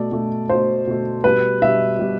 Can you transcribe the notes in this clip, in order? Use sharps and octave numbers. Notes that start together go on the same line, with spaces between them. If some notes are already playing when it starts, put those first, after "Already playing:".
Already playing: B2 A3 D5
B2 A3
B2 A3 C5
B2 A3
B2 G3 B4
B2 G3 E5
B2 G3